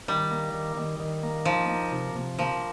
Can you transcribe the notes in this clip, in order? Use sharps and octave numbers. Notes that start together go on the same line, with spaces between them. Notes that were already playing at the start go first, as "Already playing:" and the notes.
D#3 G3
A#3
D#3
D#3
D#3
A#3
F3 D#4
A#3
C3
C3
F3 A#3